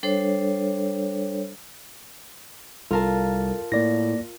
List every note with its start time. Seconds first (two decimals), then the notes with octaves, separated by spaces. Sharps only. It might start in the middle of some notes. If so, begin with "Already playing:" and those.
0.03 G3 D4 A4 C5 C#5
2.91 C2 F4 A4 A#4 A5
3.72 A2 A#3 D5 A#6